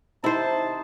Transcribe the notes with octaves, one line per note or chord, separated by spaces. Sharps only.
C3 D#4 E4 C5 A5